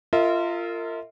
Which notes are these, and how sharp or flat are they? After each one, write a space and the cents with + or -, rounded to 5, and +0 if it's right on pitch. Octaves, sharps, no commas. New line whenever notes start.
F4 -15 A#4 -35 E5 -45